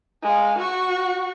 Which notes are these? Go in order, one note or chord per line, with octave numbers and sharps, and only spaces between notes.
G#3 F5
F#4 C#6